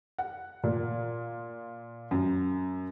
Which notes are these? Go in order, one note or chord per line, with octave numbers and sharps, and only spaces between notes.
F#5
A#2
F#2